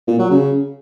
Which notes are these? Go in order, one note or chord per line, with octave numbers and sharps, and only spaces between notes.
A#2
F#3
C#3